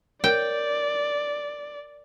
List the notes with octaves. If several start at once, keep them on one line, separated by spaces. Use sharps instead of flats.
A#4 C#5 D5 G5